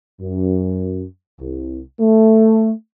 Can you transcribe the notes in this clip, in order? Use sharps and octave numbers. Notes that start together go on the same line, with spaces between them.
F#2
C2
A3